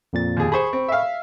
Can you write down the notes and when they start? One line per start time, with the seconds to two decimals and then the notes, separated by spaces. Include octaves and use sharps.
0.13 F2 A#2 A6
0.37 D#2 G#4
0.52 G#4 C5 B5 C#6
0.73 C4
0.88 E5 F5